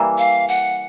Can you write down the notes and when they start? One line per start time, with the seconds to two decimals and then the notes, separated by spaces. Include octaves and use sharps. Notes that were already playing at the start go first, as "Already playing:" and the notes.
Already playing: E3 G3 A#3
0.18 F5
0.48 F#5